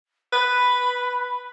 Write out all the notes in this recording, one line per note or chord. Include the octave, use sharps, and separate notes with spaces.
B4 B5